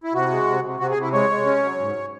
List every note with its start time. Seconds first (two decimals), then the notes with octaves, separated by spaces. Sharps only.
0.04 E4
0.14 C3 F#4
0.30 G#3
0.47 C3
0.63 C3
0.80 C3 F#4
0.91 G#4
0.97 C3 E4
1.13 G#3 C#5
1.30 G#3
1.46 C#4
1.63 F#3
1.80 G#2